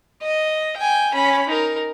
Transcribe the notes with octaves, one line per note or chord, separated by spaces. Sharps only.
D#5
G5 G#5
C#4 B5
D#4 A#4